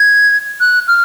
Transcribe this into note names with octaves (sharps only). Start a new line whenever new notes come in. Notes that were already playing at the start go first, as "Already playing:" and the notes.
Already playing: G#6
F#6
F6